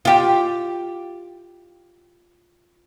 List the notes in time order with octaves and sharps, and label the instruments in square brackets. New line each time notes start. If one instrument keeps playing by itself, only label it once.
[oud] F4 G4